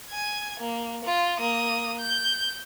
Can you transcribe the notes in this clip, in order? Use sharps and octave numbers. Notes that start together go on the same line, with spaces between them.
G#5 G#6
A#3
F4
A#3 D#6
G6